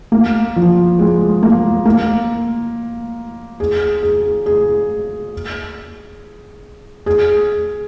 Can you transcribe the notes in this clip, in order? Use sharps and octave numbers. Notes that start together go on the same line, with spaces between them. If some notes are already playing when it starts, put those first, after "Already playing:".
A#3
F3
G#3
A#3
A#3
G#4
G#4
G#4
G#4